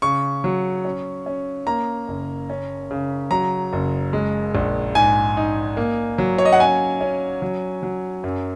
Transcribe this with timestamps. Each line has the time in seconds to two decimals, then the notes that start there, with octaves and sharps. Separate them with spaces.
0.02 C#3 C#6
0.44 F#3
0.85 C#4
1.26 C#4
1.67 A#3 A#5
2.08 F#1
2.50 C#4
2.91 C#3
3.31 F#3 A#5
3.73 F#1
4.13 G#3
4.55 A#1
4.95 G#2 G#5
5.37 D#4
5.77 A#3
6.18 F#3
6.38 C#5
6.45 D#5
6.52 F#5
6.59 C#4 G#5
7.01 C#4
7.42 F#3
7.83 F#3
8.24 F#2